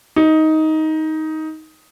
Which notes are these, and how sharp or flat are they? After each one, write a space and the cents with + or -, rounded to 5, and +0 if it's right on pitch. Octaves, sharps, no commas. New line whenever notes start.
D#4 +15